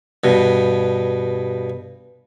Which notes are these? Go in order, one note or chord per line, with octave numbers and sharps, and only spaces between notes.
G2 B2